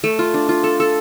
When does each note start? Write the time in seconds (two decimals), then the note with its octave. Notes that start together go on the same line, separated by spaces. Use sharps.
0.04 A3
0.19 F4
0.34 D4
0.49 F4
0.64 A4
0.80 A4